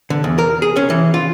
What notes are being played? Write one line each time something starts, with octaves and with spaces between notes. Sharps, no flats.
D3
E2
A#4
G#4
C#4
E3
F4